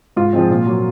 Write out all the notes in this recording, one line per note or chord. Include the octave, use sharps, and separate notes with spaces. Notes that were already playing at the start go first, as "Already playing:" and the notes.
G#2 F4
F3 G#3 C4
A#2
F#3 A#3